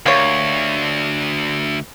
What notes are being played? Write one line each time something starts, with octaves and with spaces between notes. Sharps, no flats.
D2 A#3 G4 C#5